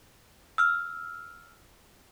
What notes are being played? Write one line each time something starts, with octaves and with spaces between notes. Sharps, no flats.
E6 F6